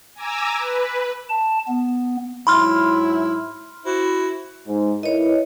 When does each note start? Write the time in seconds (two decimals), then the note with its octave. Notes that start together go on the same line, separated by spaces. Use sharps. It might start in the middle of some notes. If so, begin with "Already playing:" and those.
0.14 G#5 A#5 D6 E6
0.57 B4
1.30 A5
1.68 B3
2.47 G#2 F#3 E4 B5 C6 F6
3.86 E4 F#4 C5
4.67 G#2
5.03 E4 A#4 B4 C#5 D#5